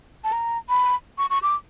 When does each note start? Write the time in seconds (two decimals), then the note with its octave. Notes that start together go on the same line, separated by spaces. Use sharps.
0.24 A5
0.32 A#5
0.69 B5
1.18 C#6
1.30 C#6
1.42 D6